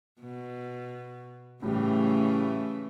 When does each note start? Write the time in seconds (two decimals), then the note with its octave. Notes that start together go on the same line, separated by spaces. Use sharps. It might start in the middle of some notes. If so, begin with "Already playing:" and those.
0.20 B2
1.62 A2 C#3 E3 G3 A3 G4